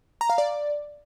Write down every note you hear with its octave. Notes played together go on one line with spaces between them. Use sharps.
A#5
F5
D5